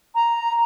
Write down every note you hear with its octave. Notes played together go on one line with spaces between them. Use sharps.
A#5